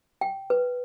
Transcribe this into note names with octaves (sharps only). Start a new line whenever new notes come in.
G5
B4